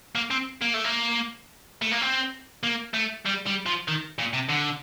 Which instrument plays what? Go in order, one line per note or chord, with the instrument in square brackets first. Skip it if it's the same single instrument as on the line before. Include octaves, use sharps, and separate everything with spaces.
[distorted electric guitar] A#3
C4
A#3
A3
A#3
A3
A#3
C4
A#3
A3
G3
G3
F3
D#3
A#2
C3
D3